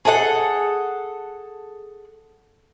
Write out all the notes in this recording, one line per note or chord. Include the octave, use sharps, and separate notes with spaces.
G#4 A4 D#5 F#5